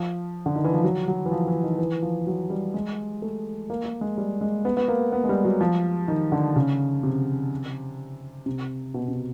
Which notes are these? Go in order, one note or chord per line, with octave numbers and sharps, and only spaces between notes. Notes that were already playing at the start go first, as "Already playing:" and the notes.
Already playing: F3
D3
D#3
E3
F3
F#3
F#3
E3
F3
E3
D#3
E3
F3
F#3
G3
G#3
A3
A#3
A#3
G#3
G3
G#3
B3
B3
A#3
B3
G#3
G3
F#3
F3
D#3
D3
C#3
C3
C3
B2
C3